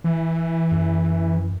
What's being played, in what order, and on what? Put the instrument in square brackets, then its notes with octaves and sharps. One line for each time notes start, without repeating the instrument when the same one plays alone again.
[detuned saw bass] E3
[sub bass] F#2